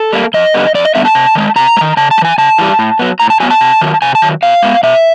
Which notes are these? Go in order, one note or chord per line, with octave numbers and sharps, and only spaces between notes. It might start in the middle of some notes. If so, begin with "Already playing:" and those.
Already playing: A4
G3 A#3
F2 D#5
D3 G3 B3
F2 D5
D#5
D3 G3 B3 E5
A5
C3
D#3 G#3
C3 A#5
G#3
D#3
C#3 A5
A5
G3
E3 G#5
C#3 A5
E3 G3
A2
F#3 B3
A2 A#5
A5
F#3 B3 G#5
A5
C3
D#3 F#3
C3 G#5
A5
D#3 F#3
B2 F5
G#3 B3
B2 E5